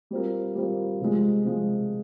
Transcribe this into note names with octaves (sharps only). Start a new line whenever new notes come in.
G3 C4 F4 A#4
G3 C4 F4 A#4
C3 F3 G#3
C3 F3 G#3